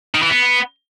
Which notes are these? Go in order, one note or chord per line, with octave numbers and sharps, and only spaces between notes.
D#3
E3
B3